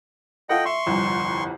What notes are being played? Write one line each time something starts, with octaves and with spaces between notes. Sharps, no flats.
F4 A4 D#5 F#5 G5
E5 C6 C#6
G1 C2 F2